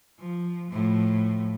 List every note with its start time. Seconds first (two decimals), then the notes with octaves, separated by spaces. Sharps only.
0.19 F3
0.70 A2 F3